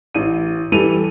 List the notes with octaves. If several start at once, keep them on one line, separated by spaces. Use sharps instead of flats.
A1 D#7
E3 G3 A4 D#7 F7